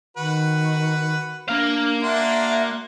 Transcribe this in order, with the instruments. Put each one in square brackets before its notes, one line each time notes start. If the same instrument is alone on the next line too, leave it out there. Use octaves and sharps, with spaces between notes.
[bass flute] D#3 [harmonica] F#4 B4
[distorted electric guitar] A#3 F5 [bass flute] D4
[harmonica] D4 F#4 C6 [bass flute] E5